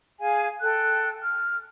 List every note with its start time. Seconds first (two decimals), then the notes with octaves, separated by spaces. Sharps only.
0.20 G#4 F5 G#5
0.61 A4 G5 F#6
1.23 F6